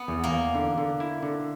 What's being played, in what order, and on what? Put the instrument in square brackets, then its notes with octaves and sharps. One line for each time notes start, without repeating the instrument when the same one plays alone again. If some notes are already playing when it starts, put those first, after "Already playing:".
Already playing: [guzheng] B3
[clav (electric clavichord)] E2
[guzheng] A#3
[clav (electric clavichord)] E2
D3
D3
E4
D3